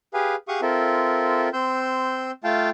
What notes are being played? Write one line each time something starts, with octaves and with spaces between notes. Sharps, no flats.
G4 G#4 B4 F5 G#5
G4 G#4 F5 F#5 C#6 D#6
C4 F4 A4 A#4 E5
C4 C6 E6 G6
A3 F4 F5 G5 A5